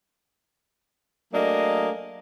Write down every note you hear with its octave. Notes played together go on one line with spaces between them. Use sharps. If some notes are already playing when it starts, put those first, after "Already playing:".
F#3 A3 A#3 D4 G#4 D#5